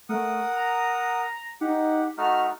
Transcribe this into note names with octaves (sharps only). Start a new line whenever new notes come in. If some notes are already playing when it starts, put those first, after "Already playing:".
A3 A#4 F#5 D#6
A#5
D#4 G4 F#5
A3 D#4 F#4 F6